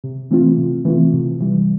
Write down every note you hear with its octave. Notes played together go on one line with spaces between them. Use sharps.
C3
E3 A3 C4 F4
C3
E3 A3 C4 F4
C3
E3 G3